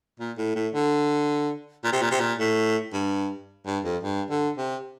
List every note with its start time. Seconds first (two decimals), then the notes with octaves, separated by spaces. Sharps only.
0.19 A#2
0.38 A2
0.56 A2
0.74 D3
1.84 A#2
1.92 C3
2.02 A#2
2.11 C3
2.20 A#2
2.38 A2
2.93 G2
3.66 G2
3.84 F2
4.03 G2
4.30 D3
4.57 C3